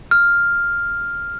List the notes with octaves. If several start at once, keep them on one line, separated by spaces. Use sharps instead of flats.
F6